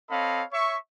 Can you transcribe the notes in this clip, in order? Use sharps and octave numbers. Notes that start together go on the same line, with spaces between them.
C4 A4 C#5 D#5 F5 B5
C#5 E5 C#6